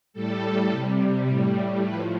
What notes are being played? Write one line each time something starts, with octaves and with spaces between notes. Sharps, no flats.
A2 G3 A4
C3 G3
A2 G3
A2 F3 B4